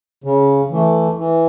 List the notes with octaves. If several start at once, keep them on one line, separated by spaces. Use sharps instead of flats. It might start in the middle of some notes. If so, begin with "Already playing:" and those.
C#3
E3 A3
E3